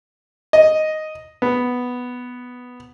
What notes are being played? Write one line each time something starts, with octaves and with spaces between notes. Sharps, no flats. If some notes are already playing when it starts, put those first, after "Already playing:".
D#5
B3